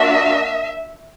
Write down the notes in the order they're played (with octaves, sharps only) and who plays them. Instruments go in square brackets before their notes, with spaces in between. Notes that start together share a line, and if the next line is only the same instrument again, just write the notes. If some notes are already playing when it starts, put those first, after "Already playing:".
Already playing: [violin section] A#3 D4 F#4 E5